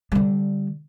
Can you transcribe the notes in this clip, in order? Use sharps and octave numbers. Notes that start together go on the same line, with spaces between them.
D3 G3